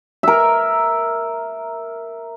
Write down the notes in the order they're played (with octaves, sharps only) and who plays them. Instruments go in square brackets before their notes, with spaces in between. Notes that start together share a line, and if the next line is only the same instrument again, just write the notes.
[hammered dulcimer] A#4 E5